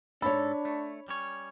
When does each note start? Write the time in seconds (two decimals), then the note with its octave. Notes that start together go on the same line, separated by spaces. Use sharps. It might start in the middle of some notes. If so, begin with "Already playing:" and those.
0.22 G#2 D4 A4 C#5 B5
0.65 A3
1.08 G3 C#4 C#5